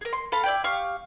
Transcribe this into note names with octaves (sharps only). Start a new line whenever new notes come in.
G#4 A#4
C6
A4 F5 B5
E4 D5 G5
G4 F5 C#6 F6